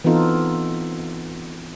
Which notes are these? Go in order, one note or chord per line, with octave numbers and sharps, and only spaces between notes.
E3 B3 C4 D#4 F4 A4